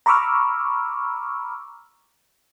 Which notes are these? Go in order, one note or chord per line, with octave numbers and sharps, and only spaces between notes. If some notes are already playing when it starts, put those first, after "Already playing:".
A#5 B5 C#6 D6 E6 F6